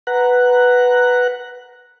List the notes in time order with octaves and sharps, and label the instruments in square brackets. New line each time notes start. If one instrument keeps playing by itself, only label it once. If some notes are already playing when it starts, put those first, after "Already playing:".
[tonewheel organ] B4 F#5 A#5 F#6